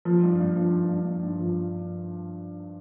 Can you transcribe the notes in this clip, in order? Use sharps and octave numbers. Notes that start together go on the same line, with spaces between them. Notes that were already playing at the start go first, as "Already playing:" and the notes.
F3
G2
G2
F3
G2
G2
G2
G2
F3